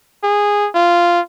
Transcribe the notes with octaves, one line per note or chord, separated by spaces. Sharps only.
G#4
F4